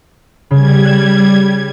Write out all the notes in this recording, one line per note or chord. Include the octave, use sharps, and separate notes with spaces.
C#3 G3 G#6
F#6 E7